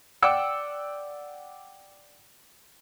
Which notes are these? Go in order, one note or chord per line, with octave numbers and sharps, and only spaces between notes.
D5 F#5 G5 D6 E6 C#7